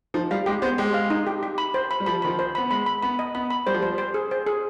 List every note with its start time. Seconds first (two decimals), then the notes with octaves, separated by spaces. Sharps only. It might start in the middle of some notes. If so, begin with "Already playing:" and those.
0.14 F3 D#4
0.31 G3 F5
0.46 G#3 G4
0.62 B3 C5
0.78 G#3 G4
0.94 F5
1.10 D#4
1.27 G4
1.43 G4
1.58 B5
1.74 C5
1.91 B5
2.00 G3
2.06 F3 B5
2.22 D#3 B5
2.27 F3
2.39 C5
2.55 B3 B5
2.71 G#3 B5
2.86 B5
3.03 B3 B5
3.19 D#5
3.35 B3 B5
3.50 B5
3.67 G3 C5
3.74 F3
3.81 G3 C5
3.98 C5
4.14 G#4
4.31 C5
4.47 G#4